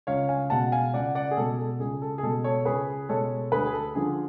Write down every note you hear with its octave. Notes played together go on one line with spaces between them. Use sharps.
C#2 C#5 F5
F5 G#5
B2 G#3 F#5 A5
F5 G#5
C#2 D5 F#5
D5 F#5
G#4
B2 G#3 A4
A4
C#2 G#4
A4
G#4
B2 G#3 A4
A4 C#5
C#2 G#4 B4
B2 G#3 A4 C#5
D2 G#4 B4
G#4
A4
D3 F3 G#4